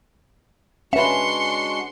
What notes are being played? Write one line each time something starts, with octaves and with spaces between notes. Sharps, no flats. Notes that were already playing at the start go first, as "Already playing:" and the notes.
G#3 C#4 D4 F#4 B4 E5 C6 C#7